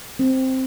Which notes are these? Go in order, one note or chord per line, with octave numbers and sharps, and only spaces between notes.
C4